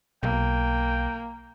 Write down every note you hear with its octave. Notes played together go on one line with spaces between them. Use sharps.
B1 A#3 G5